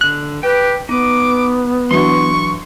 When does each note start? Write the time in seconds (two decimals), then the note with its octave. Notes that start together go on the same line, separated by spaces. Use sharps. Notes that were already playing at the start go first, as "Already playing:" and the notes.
0.01 D3 F#6
0.43 G4 B4 G5
0.89 B3 D#4 B4 D6
1.91 E3 F#3 D4 C6 C#6